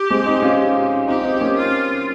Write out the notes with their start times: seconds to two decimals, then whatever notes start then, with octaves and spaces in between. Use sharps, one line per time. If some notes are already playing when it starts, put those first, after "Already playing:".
Already playing: G4
0.10 G#3 C4
0.26 C4 D#4
0.42 C#4 F4
1.08 C4 D#4 G4
1.24 C4 D#4
1.41 A#3 C#4
1.57 F4